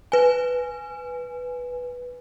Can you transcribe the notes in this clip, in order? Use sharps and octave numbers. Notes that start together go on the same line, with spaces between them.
B4 G#5